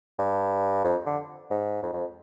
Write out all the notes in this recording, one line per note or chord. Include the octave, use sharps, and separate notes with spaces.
G2
F2
D3
G#2
F2
F2